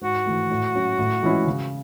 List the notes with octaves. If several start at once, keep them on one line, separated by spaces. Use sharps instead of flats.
G#2 F#4
E3 A3
A2
F#3 C#4
A2
E3 G#3 C#4 E4
C#3